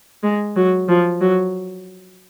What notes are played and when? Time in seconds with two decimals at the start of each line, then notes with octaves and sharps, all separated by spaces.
0.23 G#3
0.56 F#3
0.89 F3
1.21 F#3